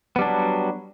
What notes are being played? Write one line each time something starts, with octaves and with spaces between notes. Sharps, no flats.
F#3 G3 B3 D4